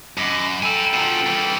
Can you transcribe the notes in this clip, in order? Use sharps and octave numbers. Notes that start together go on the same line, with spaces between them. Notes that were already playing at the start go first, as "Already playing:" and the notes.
F#2 D#5 B5 D6
A4 G5 G#5 A#5 B5
B2 F3
G2 E3